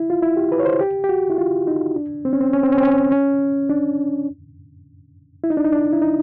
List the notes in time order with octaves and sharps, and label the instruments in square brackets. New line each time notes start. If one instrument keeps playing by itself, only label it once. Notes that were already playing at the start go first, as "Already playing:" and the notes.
Already playing: [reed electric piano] E4
F4
E4
G4
B4
C#5
C5
G4
G4
F#4
E4
F4
D#4
D4
C4
C#4
C4
C#4
C4
C#4
C4
C#4
C#4
D4
E4
D#4
D4
D#4
D4
E4
D#4